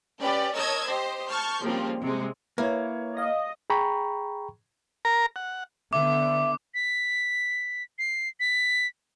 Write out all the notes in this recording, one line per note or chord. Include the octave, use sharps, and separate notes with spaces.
C#4 G4 B4 D5 G5
A#4 C#5 D#5 A5 E6 G#6
G4 C5 D#5
A5 C#6 F6 G6
C#3 F3 G3 A#3 C4
C3 G#3
A#3 E4 B4 C#5
D#5 F5 A#6
G#4 G5 A#5 B5 C#6
A#4 A#5
F#5
D3 B3 E5 D6
B6
C7
B6